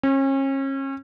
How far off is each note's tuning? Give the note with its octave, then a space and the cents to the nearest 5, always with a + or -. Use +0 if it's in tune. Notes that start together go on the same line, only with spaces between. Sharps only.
C#4 -35